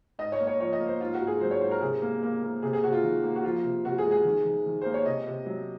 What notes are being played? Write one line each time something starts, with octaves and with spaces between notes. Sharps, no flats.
G#2 D#5
C#5
A#3
C#5
F3 C#5
D#5
A#3
C5
G#2 F4
F#4
G#2
G#4
F#3 C5
C#5
G#2 C5
A#4
C3 G#4
A#3
A#3
A#3
C3 G#4
G#4
C3 F#4
F4
D#3
A#3
F#4
F3 F4
C3
C3 F#4
G#4
G#3
G#4
D#3
D#3
D#3
A#3 C5
C#5
C3 D#5
C3
F#3